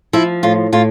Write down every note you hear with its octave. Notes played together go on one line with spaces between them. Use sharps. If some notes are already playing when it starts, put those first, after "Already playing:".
F3 E4
A2 F4
A2 F4